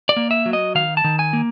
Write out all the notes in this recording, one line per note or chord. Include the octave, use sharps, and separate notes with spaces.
D5
A#3
E5
F#3
D#5
D#3 F5
A5
D#3
G#5
A#3